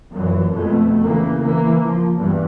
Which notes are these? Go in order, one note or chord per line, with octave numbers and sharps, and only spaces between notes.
F#2 A#2 E3
F2 B2 A3
C#3 E3 A#3
E3 A#3
F3
E2 G2 E3